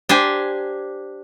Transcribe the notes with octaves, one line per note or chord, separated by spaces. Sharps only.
D4 G4 C5 G#5